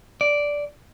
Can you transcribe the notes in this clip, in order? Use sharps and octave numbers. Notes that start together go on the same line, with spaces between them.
D5